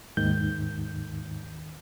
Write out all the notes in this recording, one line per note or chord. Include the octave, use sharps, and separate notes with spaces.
D#2 G#2 D#3 G6